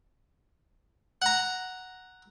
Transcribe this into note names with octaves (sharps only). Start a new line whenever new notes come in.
F#5 A#5